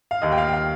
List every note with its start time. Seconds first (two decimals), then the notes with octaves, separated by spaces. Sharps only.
0.11 F5
0.22 D#2 D#5
0.32 G5
0.38 F5
0.48 G5
0.53 F5